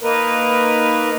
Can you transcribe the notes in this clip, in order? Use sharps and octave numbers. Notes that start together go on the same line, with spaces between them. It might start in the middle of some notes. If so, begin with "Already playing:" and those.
A#3 D#4 A#4 B4